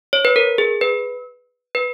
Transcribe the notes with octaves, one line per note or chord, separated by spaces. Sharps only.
C#5
B4
A#4
G#4
B4
B4